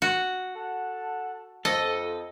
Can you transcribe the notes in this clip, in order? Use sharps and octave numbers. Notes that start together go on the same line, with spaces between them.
F#4
A4 F#5 A5
F2 A4 D#5